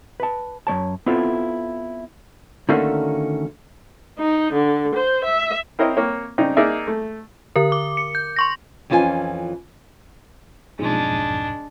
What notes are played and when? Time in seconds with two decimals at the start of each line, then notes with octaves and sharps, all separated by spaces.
0.20 B4 A5
0.67 F#2 G#3 C#5 A5
1.06 B3 C4 E4 F4 A4
2.69 D3 D#3 A3 A#3 C#4 F#4
4.19 D#4
4.53 D3
4.95 C5
5.24 E5
5.79 C4 E4 A#4 C5 C#5 D#5
5.97 A#3 C4 C#5
6.38 C#3 C4 D4 D#4
6.57 A#3 D#4 G#4 D5 E5
6.88 A3
7.56 D3 A#4
7.72 D6
7.97 C#7
8.15 G6
8.36 C6 C#6 A#6
8.90 F2 E3 C#4 F4 G#4 G#5
10.79 B1 F2 G#2 G#3 D4